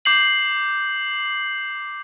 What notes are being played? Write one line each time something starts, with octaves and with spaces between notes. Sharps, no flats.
D6 G6 C7 F#7